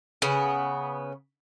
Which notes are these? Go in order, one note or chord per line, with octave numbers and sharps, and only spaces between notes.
C#3 B3